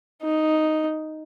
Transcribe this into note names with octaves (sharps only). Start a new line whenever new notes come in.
D#4